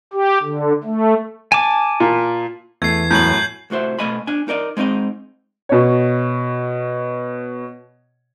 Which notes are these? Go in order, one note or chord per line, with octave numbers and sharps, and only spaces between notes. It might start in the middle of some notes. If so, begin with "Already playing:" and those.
G4
D3
A3
G#5 A5 D6
A#2
E2 A3 G#6 C7
F#2 A2 G6 F#7
C2 A2 F#4 C5 E5
B2 A3 D#5 G#5 B5
D4 G#5
D#4 A#4 D5 D#5
G#3 C4 D#4 C#5 D#5
B2 C#5